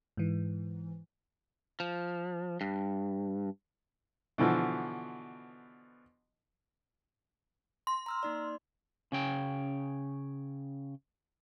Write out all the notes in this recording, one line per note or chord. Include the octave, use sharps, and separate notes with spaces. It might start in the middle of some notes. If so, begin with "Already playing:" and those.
G#2 E3
F3
G2
B2 D3 E3 F3
C6
A#5 E6 F6
A#3 D#4 D5
C#3 C#4 G5